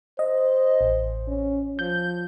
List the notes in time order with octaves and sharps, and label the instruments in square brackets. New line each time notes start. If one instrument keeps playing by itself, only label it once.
[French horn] C5 [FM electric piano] D#5
[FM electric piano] A1
[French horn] C#4
[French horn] F3 [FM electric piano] G6